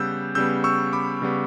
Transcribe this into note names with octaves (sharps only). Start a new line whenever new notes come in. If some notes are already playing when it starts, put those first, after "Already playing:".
Already playing: C#3 G3 B3 E6 F#6 G6
C#3 G3 B3 E6 G6
C#6 E6
B5 D6
C#3 G3 B3